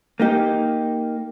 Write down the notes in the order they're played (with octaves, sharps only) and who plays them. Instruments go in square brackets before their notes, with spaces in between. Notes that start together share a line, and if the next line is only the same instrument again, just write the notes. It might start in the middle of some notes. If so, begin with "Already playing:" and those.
[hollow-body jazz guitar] A#3 D#4 G4